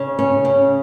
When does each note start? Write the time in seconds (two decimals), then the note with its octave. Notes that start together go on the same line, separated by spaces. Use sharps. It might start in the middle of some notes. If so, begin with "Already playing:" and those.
Already playing: C#3
0.19 C#4
0.45 C#3